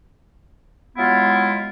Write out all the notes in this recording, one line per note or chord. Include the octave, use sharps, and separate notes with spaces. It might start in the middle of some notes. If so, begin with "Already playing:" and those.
F#3 G#3 B3 E4 F4